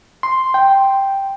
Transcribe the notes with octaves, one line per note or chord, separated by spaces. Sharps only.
C6
G5